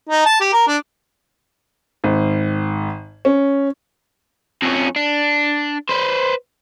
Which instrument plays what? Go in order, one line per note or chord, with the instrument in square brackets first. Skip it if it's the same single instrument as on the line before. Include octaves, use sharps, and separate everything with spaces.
[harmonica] D#4
A5
G4
A#4
D4
[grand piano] G#1
C#4
[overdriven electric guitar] F2 C#4
D4
B4 C5